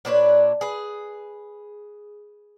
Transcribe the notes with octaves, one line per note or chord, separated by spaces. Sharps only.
A#2 D4 B4 C#5
G#4 B4